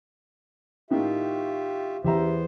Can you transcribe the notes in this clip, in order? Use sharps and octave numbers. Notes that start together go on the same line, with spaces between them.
A2 D#3 F4 G4 E5
E2 E3 B3 G4 C5 E5 A#5